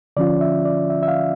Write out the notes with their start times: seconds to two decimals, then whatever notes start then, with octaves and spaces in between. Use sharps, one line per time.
0.17 D3 F3 C#4 F4 D5
0.41 E5
0.65 D5
0.90 E5
1.03 E5
1.08 F5